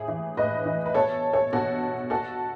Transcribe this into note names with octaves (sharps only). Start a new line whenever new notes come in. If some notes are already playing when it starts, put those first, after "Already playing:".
Already playing: A2 G#4
E3
A2 B4 D#5
E3
B4
B2 A4 C#5
A4 C#5
B2 F#4 A4
B2 F#4 A4